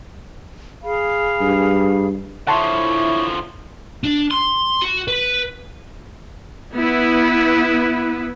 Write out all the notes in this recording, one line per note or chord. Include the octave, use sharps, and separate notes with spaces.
G#4 F5 B5
G2
D3 F3 E4 C#5 F#5 A5 C6
D4
C6
F#4
B4
B3 E4 B4